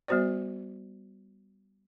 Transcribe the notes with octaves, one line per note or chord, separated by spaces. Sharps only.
G3 B3 F#4 C5 D5